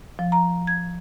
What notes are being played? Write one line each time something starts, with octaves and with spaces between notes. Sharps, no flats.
F3
A#5
G#6